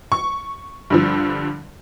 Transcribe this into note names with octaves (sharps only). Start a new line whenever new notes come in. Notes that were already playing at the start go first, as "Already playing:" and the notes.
C#6
G2 D3 F3